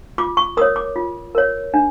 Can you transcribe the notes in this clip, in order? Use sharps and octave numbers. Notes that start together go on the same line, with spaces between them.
F4 D6
C#6
A#4 C#5 D#6
D6
F4
A#4 C#5
D4